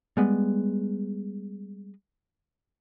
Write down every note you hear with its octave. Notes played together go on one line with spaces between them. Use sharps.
G3 G#3 B3